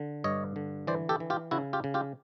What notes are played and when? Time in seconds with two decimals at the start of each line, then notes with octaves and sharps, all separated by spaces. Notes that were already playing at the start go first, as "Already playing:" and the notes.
Already playing: D3
0.24 G2 C#5 D#5
0.56 D3
0.87 E3 C5 D5
1.09 G4 A4
1.20 E3
1.30 F4 G4
1.51 C#3 E4 F#4
1.73 F4 G4
1.84 C#3
1.94 F4 G4